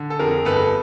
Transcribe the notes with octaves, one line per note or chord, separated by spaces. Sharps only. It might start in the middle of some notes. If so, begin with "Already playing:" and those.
Already playing: D3
A4
F2 G#4 A#4
G1 A4 B4